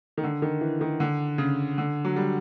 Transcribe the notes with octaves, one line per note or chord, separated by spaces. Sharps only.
D#3
D3
D#3
E3
D#3
D3
C#3
D3
F#3
G3